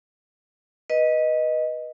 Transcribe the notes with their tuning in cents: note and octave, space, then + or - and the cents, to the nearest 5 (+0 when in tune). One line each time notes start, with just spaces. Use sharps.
B4 -15 D#5 +0